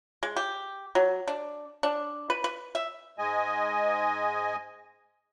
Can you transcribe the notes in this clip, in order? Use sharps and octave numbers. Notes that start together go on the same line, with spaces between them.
G#3
G4
F#3
D4
D4
B4
B4
E5
G#2 G#3 D#5 G#5